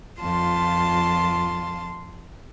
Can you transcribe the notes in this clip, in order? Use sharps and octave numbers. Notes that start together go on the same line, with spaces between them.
F2 F4 A5 C6